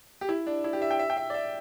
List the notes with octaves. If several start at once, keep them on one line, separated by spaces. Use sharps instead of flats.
G4
E4
D4
E4
G4
E5
G5
E5
G5
E5
D5
E5